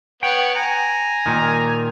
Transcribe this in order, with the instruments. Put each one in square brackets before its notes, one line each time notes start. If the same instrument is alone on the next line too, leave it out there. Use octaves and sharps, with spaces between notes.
[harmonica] B3 C#5 F#5 [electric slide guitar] G5
[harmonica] G#5 A#5
[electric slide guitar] A#2 D#3